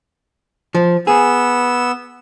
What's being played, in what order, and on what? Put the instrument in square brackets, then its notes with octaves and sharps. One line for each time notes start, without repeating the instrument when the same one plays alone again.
[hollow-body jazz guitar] F3
[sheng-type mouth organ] B3 E6 [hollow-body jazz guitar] G#4